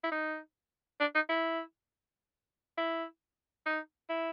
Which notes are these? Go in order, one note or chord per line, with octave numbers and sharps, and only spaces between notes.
E4
D#4
D4
D#4
E4
E4
D#4
E4